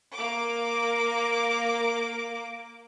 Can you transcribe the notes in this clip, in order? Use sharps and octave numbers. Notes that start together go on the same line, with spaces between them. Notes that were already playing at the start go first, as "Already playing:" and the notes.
A#3 D6